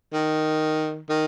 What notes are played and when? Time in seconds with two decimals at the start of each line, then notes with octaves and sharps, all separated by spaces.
0.13 D#3
1.10 D#3